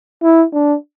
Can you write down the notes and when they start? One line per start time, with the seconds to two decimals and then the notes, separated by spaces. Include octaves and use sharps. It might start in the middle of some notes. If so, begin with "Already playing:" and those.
0.23 E4
0.53 D4